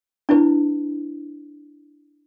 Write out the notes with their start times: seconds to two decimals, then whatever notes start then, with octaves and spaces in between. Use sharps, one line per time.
0.29 D4 E4 B4